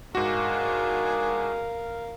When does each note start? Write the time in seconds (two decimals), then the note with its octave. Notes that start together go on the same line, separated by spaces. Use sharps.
0.15 G#2 D4 F#4 G#4 A#4 F5